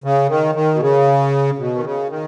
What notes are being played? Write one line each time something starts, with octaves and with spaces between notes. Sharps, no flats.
C#3
D#3
D#3
B2
C#3
B2
D#3
C#3
D#3